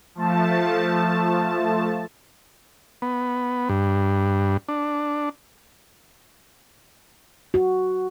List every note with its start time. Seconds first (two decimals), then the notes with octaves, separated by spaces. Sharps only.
0.15 F3 A3 A5
3.02 B3
3.69 G2
4.69 D4
7.54 F#4